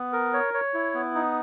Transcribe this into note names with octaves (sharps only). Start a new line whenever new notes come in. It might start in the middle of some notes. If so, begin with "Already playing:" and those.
Already playing: B3
A#4
C#5
C#5
E4
B3
D#4